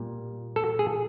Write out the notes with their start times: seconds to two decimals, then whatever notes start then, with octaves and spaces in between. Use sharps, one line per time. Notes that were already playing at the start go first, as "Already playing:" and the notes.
Already playing: A#2 G3
0.56 A4
0.79 G#4